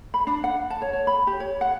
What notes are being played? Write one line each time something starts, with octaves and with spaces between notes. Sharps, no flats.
B5
D4
F#5
A5
C#5
C#5
B5
G4
C#5
F#5